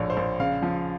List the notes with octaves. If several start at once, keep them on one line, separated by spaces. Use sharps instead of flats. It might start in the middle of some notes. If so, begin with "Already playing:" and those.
Already playing: A#1 A2 F3 C#5
C5
A#1
C#3 F5
F3